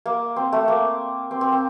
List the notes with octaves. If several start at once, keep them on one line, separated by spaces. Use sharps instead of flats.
A#3
C4
A3
A#3
C4
C4
C4